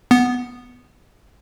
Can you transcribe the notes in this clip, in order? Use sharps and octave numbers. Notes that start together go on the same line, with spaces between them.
B3